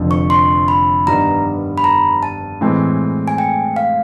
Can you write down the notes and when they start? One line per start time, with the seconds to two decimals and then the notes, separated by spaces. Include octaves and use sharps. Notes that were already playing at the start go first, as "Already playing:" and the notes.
Already playing: F1 F2 D3 F3
0.11 C#6
0.30 C6
0.68 B5
1.07 G2 D#3 G3 B3 A#5
1.78 B5
1.84 A#5
2.23 A5
2.61 A2 E3 G#3 C4
3.28 G#5
3.38 G5
3.76 F5